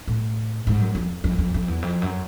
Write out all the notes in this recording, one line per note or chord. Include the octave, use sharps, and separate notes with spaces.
A2
G#2
F#2
F2
F2
F2
F2
E2
F2
F#2